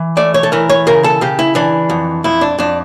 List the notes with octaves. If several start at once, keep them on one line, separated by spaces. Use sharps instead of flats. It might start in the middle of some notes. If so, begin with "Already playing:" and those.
Already playing: E3
A3 D5
C#5
A4
E3 A#4
C#5
C#3 A#4
A4
C#3 G4
E4
E3 D4
F2
F2 E4
D4
F2 D4